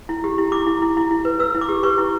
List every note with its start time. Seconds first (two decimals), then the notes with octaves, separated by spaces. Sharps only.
0.09 E4
0.24 G4
0.38 E4
0.52 E4 D6
0.66 E4
0.82 E4
0.97 E4
1.11 E4
1.25 B4
1.39 B4 E6
1.55 E4
1.61 D6
1.69 G4
1.83 B4 C#6
1.98 E4